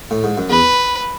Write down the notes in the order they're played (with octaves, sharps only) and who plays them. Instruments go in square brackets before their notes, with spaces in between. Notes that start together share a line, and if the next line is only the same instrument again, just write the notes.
[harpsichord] A2
G#2
F#2
[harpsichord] E2 [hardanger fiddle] B4